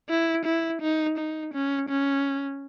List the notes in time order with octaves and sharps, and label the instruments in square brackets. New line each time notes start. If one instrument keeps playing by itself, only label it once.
[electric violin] E4
E4
D#4
D#4
C#4
C#4